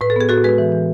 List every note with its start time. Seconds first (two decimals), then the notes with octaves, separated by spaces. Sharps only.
0.01 A2 B4
0.10 A4
0.16 B3 G#4
0.29 A2 F#4 A4
0.44 G#3 G#4 B4
0.58 E3
0.72 E3